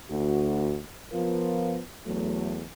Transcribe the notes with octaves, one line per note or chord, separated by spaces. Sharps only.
D2 F#4
F3 B3 F4 A#4
E2 F#3 A3